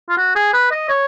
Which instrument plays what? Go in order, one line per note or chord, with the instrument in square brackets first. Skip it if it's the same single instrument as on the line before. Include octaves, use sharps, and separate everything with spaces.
[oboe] F4
F#4
G#4
B4
D#5
C#5